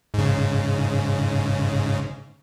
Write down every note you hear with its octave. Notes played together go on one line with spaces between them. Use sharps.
G#2 C#3